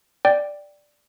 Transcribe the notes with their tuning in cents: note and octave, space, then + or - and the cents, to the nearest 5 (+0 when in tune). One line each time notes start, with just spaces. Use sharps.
D5 +0 G5 +0